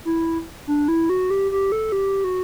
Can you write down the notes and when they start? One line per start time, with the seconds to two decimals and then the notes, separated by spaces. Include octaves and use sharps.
0.05 E4
0.67 D4
0.88 E4
1.10 F#4
1.30 G4
1.52 G4
1.72 A4
1.92 G4
2.24 F#4